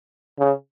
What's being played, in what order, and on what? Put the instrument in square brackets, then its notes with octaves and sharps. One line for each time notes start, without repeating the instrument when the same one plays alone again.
[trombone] C#3